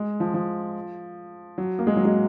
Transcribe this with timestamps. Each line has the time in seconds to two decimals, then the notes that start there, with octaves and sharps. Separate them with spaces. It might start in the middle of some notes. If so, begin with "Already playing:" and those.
Already playing: G#3
0.20 F3
0.34 F3
1.58 F#3
1.79 A#3
1.87 G#3
1.97 F#3
2.05 G#3